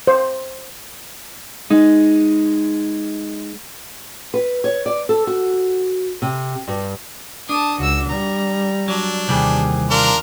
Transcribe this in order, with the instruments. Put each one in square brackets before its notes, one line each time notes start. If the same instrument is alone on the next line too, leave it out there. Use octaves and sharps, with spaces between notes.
[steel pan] C5
[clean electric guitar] G#3 D#4
[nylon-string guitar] B4
C#5
D5
A4
F#4
C3
G2
[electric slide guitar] D4 [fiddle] A5 D#6
[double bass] C#2 [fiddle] F#4 E6
[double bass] G3 [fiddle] A#5
[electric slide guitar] F#3 [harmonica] D4
[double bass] D#2 [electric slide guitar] C3 E3 G3 [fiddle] G#4
[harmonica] D4 F4 A#4 [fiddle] F6